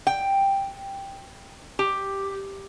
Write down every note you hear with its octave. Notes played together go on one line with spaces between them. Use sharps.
G5
G4